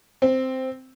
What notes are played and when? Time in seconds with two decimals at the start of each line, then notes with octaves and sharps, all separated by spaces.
0.22 C4